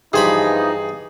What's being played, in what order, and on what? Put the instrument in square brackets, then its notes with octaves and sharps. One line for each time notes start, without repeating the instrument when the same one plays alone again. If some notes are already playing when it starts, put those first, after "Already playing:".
[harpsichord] G2 C5 B5 [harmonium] E3 F3 [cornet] D#4 [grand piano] G#4